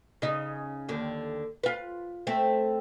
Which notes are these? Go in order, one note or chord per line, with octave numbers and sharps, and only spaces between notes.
C#3 D#4
D#2 D3
F4 B4
A3 C4